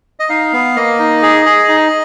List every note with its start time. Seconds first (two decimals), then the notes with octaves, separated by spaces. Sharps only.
0.20 D#5
0.29 D#4 F5
0.53 B3
0.76 A#3 D#5
0.99 D#4
1.23 G#4
1.46 G#4
1.68 D#4